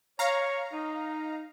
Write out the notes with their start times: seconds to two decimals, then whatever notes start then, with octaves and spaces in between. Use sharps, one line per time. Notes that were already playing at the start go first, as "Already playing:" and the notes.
0.19 C#5 F5 A#5
0.72 D#4